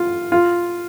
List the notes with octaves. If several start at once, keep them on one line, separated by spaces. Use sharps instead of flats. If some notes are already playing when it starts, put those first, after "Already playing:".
Already playing: F4
F4